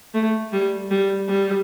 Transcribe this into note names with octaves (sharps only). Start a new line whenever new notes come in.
A3
G3
G3
G3